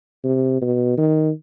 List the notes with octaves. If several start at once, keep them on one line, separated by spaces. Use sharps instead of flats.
C3
B2
D#3